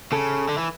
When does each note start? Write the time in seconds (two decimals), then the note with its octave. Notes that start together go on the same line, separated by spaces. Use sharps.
0.12 C#3 A4
0.49 D3
0.58 E3